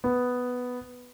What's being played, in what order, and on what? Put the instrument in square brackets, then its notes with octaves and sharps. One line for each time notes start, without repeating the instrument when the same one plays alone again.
[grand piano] B3